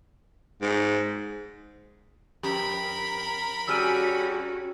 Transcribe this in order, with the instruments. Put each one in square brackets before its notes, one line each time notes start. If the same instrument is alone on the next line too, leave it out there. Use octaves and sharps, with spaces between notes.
[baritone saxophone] G#2
[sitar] F2 [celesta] G4 [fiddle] A#4 B5
[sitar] G3 G#4 D5 [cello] C#4 F#4 [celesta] E6 F6 D#7